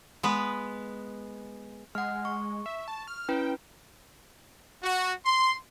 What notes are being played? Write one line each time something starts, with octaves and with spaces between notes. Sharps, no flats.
G#3 B3 B4
G#3 F#5 F6
C#6
E5
A5
F6
C#4 E4 B4 G5
F#4
C6